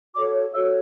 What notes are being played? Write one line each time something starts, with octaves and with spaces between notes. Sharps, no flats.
F#4 A4 C#5 D5 D6
F#4 A4 C#5 E5 E6